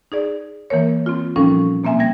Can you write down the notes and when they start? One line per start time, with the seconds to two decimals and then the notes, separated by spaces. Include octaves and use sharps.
0.12 D#4 G#4 D5
0.70 E3 A#3 A#4 C#5
1.06 C4 F4
1.36 A#2 F3 G3 C#4 D#4 A4
1.84 B2 A#3 C4 E5 G#5
1.99 B2 G3 E5 G#6 A#6